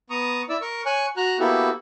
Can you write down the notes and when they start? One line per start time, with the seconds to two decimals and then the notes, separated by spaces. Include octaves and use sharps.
0.10 B3 A#5 C#6 D#6
0.49 E4 D5 E6
0.61 A#4 C#6
0.86 C#5 G#5 C#6 F#6
1.17 F#4 A#5 F#6
1.40 A#3 B3 E4 F#4 G4 A4